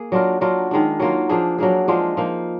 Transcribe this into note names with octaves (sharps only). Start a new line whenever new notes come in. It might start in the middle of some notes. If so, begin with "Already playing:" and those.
Already playing: A#3 G#4
F#3 D4 F4 A#4
F#3 D4 F4 A#4
D#3 G#3 D4
F#3 A#3 F4
F3 A#3 D4 G#4
F#3 A#3 D4 G#4
F3 G#3 D4 F4
F3 A#3 D#4